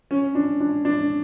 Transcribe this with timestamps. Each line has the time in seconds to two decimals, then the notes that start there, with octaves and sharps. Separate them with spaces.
0.11 C#4
0.35 D4
0.61 D4
0.85 D4